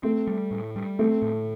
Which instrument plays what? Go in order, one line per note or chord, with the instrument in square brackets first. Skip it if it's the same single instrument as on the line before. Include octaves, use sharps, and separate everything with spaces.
[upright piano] A3 [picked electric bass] C4
[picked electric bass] G3
A2
G3
[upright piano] A3 [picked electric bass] C4
[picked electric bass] A2